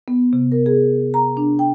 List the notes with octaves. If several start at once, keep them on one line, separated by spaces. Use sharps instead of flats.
B3
C3
A#4
G#4
A#5
D4
G5